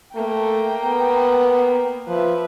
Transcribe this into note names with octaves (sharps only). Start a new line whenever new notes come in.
A3 A#3 G5 A#5
B3
F3 B4 E5